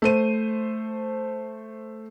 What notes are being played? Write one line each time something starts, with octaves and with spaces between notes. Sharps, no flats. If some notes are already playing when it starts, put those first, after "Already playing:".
A3 C5 D#7